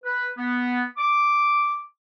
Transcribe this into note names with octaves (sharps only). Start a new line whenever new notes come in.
B4
B3
D6